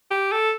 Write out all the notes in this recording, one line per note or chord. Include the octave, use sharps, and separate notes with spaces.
G4
A4